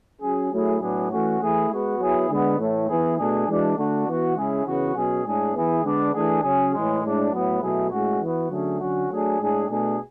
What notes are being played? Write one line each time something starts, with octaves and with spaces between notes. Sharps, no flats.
F#3 C#4 G#4
F#3 A3 E4 G#4
A2 F#3 B3 D4 G#4
E3 A3 C#4 F#4
E3 A3 E4 G#4
G#3 B3 F#4
F#3 B3 E4 G#4
D3 G#3 B3
A2 E3 A3
E3 B3 E4 G#4
B2 A3 D4 G#4
E3 G#3 D4 F#4
D3 A3 D4 F#4
E3 B3 F#4
C#3 G#3 C#4 E4 G#4
C#3 E3 B3 F#4
B2 F#3 C#4 G#4
A2 G#3 D4 G#4
E3 B3 E4 G#4
D3 G#3 B3 D4
E3 A3 D4 G#4
C#3 F#3 C#4 G#4
A2 E3 G#3
A2 G#3 D4
A2 F#3 B3
B2 F#3 A3 E4 G#4
A2 G#3 C#4 F#4
E3 B3 F#4
D3 F#3 A3 C#4 G#4
D3 F#3 C#4 F#4
F#3 A3 D4 G#4
A2 G#3 D4 G#4
B2 A3 D4 G#4